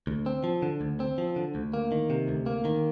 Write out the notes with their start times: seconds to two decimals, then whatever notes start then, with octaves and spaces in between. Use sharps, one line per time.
0.07 D2
0.26 C4
0.44 F3
0.62 D3
0.81 D2
1.00 C4
1.18 F3
1.36 D3
1.55 D2
1.74 A#3
1.92 D#3
2.10 C3
2.28 D2
2.46 A#3
2.65 D#3